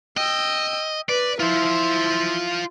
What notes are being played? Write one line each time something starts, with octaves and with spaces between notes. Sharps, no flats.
D#5 G5 E6
B4 D5
E4 F4 C5